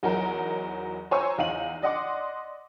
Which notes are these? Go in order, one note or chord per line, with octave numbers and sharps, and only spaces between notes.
E2 F#3 D#4 A#4
C5 C#5 G#5 A#5 C#6 E6
E2 D#4 F5 D#7 F#7
D5 D#5 F#5 C6 D6